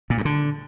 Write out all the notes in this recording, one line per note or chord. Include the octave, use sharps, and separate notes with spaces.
A#2
G2
D3